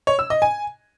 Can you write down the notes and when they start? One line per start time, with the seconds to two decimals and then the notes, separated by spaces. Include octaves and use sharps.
0.07 C#5
0.19 E6
0.30 D#5
0.42 G#5